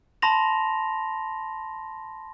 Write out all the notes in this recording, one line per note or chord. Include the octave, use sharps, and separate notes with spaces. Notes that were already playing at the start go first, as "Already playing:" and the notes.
A5 B5 C6 A#6 F7